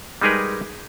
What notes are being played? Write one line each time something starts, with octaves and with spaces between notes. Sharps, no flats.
G3 G#3 D#4 G#4 A#4 B4